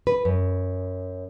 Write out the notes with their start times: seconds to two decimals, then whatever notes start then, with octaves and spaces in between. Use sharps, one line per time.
0.07 B4
0.25 F#2